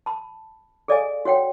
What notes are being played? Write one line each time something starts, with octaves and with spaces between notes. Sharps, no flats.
A5 B5
G#4 A4 D5 D#5 F5 G#5
F#4 C#5 F#5 G5